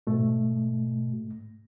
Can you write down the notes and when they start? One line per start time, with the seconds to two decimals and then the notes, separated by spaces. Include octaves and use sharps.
0.07 G#2 B2 A3